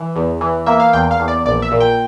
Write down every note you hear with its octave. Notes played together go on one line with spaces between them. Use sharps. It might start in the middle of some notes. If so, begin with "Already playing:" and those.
Already playing: E3
E2
E3
A#3 E5
F5
E2 G5
F5
E2
D5
A#1 D5
E5
A#2
G5